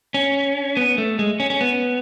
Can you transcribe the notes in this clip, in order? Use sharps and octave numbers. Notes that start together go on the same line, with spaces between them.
C#4
B3
A3
G#3
C#4
C#4
B3